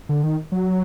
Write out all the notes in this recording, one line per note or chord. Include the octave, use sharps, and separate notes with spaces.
D3
D#3
F#3